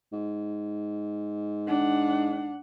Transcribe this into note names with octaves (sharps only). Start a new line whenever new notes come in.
G#2
D4 F#5